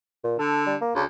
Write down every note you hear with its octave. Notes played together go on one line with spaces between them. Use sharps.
A#2
D3 A4
G3
A#3
D2 C#3